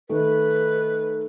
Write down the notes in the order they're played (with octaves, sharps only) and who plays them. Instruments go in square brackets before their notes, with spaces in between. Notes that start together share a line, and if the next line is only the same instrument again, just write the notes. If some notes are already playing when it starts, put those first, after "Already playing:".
[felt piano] D#3 A3 [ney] B4